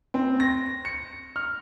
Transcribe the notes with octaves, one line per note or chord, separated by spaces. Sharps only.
C4
A#6
C#7
F6